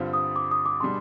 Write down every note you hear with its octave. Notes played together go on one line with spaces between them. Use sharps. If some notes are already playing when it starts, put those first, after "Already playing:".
Already playing: G2 D3 G3 C4 F4
D#6
D6
D#6
D6
B2 G3 D4 G#4 C6